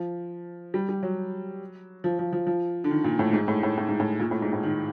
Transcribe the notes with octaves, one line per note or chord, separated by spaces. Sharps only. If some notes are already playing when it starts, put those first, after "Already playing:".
Already playing: F3
G3
G3
F#3
F3
F3
F3
F3
D3
D#3
A#2
A2
G#2
A2
A2
A2
G#2
A2
A#2
A2
G#2
A2
D#3